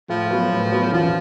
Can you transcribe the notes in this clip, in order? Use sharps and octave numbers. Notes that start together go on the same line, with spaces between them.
A2 F3
F#3 B3
A2
F#3 B3
A1 F3